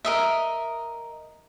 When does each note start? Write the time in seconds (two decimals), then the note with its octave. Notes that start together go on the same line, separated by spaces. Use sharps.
0.05 A#4 D#5 E5